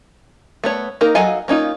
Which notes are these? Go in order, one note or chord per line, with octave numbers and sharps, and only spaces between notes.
A3 B3 C#5
A#3 D#4 A#4
F#3 A4 D#5 F5 G#5
A#3 C#4 D#4 F4